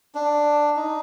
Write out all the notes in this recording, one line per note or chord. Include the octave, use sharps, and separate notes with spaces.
D4
D#4